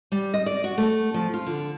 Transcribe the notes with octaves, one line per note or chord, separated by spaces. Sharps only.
G3
D#5
D5
F#4
A3
F3
F4
D3